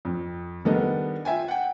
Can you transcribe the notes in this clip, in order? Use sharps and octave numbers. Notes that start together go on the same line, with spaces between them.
F2
D#3 G3 B3 D4 A4 D#5
F4 E5 G5 G#5
F#5 G5